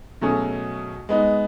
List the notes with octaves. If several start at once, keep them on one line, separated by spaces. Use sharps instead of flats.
B2 F#3 A3 C#4 G#4
G#3 B3 D#4